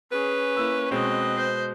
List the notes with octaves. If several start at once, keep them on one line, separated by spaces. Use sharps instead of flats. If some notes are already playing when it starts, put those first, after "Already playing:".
C#4 G#4 B4
A#3 E4 E6
B2 G#3 C4 B4 D#5
C5